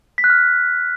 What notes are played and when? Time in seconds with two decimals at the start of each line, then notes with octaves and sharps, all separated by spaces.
0.18 B6
0.24 F#6
0.30 F6